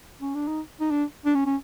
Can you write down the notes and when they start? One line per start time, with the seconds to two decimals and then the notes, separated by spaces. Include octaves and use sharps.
0.21 C#4
0.35 D4
0.47 D#4
0.80 D#4
0.90 D4
1.25 D4
1.35 C#4
1.46 C#4